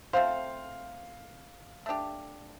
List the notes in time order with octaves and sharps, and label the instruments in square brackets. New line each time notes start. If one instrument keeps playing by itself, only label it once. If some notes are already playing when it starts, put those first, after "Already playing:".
[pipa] A3 C4 F4 C5 [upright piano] F5
[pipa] A3 D4 G4